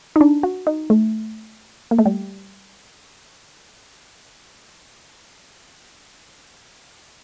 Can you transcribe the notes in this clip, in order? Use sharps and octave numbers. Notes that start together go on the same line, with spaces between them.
D#4
D4
F#4
D#4
A3
A#3
A3
G3